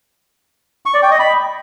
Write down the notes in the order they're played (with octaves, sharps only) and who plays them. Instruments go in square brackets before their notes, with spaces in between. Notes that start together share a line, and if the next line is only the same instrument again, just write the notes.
[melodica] C#6
D5
G5
D#5
B5